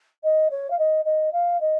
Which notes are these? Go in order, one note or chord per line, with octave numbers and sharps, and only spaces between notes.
D#5
C#5
F5
D#5
D#5
F5
D#5